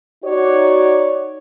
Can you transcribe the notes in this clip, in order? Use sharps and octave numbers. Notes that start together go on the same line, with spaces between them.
D#4 F#4 C#5 D5